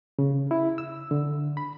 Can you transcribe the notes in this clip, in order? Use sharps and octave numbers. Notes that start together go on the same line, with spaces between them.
C#3
E4
E6
D3
B5